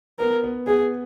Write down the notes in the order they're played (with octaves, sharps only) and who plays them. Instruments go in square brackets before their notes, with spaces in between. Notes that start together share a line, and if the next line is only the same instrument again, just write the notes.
[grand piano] B3 [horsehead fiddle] A#4
[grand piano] B3
[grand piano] B3 [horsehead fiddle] G#4